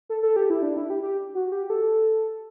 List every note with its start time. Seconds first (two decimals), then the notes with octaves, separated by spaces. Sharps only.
0.09 A4
0.23 A4
0.36 G4
0.50 E4
0.62 D4
0.77 E4
0.90 G4
1.03 G4
1.35 F#4
1.52 G4
1.70 A4